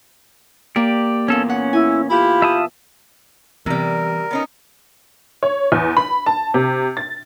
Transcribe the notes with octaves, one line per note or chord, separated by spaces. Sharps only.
A#3 G4 D5
E2 A#2 C#4 A4
C#4 F#5
E4 G#5
E4 F4 G4
E5 A5 D#6
C3 E3 G3 B3 A#4
B3 C#4 D#4
C#5
E2
B5
A5
C3
A6